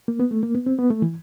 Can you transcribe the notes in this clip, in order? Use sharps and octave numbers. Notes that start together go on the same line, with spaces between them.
A#3
B3
A3
A#3
B3
C4
B3
A3
E3